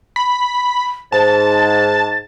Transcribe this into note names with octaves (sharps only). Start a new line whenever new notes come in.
B5
G#2 A5 A6